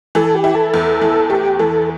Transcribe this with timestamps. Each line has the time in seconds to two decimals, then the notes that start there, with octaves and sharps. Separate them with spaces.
0.15 E3 A4
0.35 G4
0.44 E4
0.54 A4
0.74 E2
1.01 E3
1.30 A3 G4
1.59 E3 A4